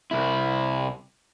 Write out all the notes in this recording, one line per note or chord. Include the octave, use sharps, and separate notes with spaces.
C2 E4